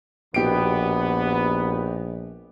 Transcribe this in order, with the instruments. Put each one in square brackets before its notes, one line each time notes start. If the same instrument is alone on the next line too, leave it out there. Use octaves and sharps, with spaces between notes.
[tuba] A#1 [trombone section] D#2 B3 [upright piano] B2 G4 D7